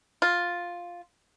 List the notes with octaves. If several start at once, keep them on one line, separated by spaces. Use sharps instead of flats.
F4